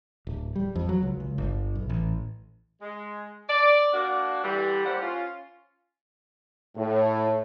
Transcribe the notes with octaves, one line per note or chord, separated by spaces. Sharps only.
D1
G3
F2
F#3
C#2
C#2
G1
B1
A1
G#3
D5
A#3 D4 F#4
G2 D3 E3 G3
A2 G3 A#3 G4 C5 F#5
C#4 F4
A2